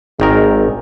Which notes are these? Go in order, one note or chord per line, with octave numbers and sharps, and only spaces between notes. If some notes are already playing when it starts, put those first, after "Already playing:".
G#1 D#3 G#3 A#4